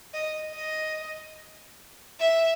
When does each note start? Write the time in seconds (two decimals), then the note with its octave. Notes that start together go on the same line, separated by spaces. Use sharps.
0.14 D#5
0.55 D#5
2.20 E5